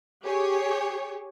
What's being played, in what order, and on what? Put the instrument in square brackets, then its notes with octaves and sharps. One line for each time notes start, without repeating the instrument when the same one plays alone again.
[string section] G4 G#4 C#5